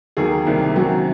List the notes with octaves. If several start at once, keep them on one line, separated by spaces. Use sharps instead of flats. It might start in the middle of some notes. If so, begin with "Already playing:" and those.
D#2 D#3 F#3 G#4
C2 C3 D#3 A#3
F#2 D#3 F#3 C4 F#4